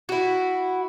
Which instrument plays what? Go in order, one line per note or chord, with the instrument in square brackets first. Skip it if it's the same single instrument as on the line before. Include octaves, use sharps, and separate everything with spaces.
[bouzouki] E4 F#4